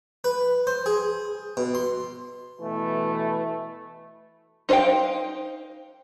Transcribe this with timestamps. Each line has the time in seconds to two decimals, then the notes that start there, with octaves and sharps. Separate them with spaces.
0.24 B4
0.67 C5
0.86 G#4
1.57 B2
1.75 C6
2.61 B2 E3 A3 B4
4.69 D#4 C5 D#5 F5 G5